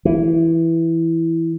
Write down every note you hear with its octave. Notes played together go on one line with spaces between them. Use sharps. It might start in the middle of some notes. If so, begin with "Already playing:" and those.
E3